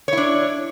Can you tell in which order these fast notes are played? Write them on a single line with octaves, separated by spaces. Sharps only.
C#5 E4 D4